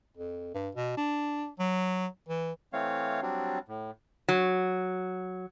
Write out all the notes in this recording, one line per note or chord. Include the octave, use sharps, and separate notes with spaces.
F2
G2
B2
D4
F#3
E3
E3 A3 C4 C#5 F5
F#3 G3 C4 D4
A2
F#3